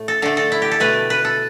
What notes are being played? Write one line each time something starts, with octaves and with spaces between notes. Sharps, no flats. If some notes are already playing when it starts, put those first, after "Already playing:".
Already playing: A2 A3
A4
D3 A3 A4
A4
E4
G4
A4
B2 A3 B4
B4
A4